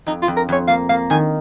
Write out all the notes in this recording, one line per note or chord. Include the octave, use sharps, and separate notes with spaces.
F2 D#4
F4
F2
A#4
F2 C#5
A#3 F5
A#3 F5
D#3 G#5